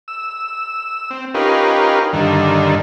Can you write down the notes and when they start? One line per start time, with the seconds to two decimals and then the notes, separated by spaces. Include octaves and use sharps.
0.08 E6
1.10 C4
1.34 C#4 D#4 F4 G4 A#4 B4
2.13 G2 D3 D#3